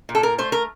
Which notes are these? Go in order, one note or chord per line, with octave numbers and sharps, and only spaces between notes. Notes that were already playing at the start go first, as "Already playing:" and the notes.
A#2
A4
A#4
A3 C5
A#4